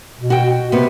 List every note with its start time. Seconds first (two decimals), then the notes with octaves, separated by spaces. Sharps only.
0.18 B2
0.30 F#4 G5
0.72 C3 B3